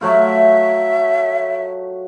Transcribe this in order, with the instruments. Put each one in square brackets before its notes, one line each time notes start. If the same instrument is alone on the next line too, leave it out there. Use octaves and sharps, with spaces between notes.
[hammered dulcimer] F#3 A3 F4 [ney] E5